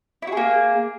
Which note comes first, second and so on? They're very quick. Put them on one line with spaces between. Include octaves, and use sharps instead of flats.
E4 F#4 G#4 A#3